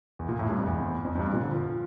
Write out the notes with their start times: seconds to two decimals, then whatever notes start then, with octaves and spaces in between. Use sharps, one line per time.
0.19 E2
0.29 A#2
0.39 A2
0.48 G2
0.58 F2
0.67 E2
1.05 F2
1.15 F2
1.19 G2
1.33 A#2
1.43 D3
1.52 F3